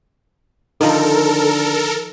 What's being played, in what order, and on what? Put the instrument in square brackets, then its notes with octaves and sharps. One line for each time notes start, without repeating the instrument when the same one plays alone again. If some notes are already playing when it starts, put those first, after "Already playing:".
[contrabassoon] D3 [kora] D#3 F3 [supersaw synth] A4 A#4